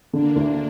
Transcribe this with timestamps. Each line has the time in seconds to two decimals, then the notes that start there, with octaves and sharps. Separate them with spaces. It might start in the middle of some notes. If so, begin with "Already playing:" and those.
0.13 D3 A#3 D4
0.36 D2